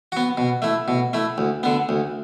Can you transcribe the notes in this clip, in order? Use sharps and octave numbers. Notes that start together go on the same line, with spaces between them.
B3 F#4
B2
A3 E4
B2
A3 E4
D2
D3 B3
D2